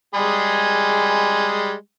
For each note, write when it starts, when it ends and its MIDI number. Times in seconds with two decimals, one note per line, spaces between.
0.14 1.74 55
0.14 1.74 56
0.14 1.74 68